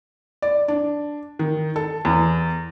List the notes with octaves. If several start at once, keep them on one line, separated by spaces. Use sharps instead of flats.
D5
D4
D#3
A4
E2